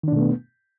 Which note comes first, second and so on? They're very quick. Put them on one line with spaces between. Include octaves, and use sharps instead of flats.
D#3 D4 B2 A3 B3